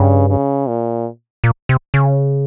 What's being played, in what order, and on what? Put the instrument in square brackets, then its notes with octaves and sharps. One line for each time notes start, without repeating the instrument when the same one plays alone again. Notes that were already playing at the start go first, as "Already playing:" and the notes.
Already playing: [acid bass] G2 [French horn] C#3
[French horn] C#3
A#2
[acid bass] A#2
C3
C#3